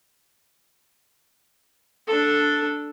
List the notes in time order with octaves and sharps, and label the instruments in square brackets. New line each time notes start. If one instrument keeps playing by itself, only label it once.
[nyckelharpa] D4 A4